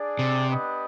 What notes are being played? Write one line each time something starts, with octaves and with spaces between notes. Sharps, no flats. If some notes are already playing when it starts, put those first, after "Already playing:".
Already playing: D4 G#4 D5
C3
B3 D4 G4 B4 D#5